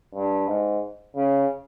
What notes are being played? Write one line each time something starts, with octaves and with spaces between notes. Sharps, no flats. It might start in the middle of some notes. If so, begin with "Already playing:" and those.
G2
G#2
C#3